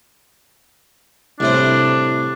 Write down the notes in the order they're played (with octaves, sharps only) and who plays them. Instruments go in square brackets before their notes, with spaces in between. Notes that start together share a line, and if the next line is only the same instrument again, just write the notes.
[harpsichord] C2 A2 C5 [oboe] D4